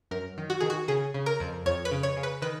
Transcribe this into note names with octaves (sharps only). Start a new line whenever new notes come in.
F#2 A#4
D#3
F#4
D#3 G#4
F#4
C#3 G#4
C#3
A#4
F2
F2 C#5
B4
C#3
C#5
C#3
B4
D#3 B4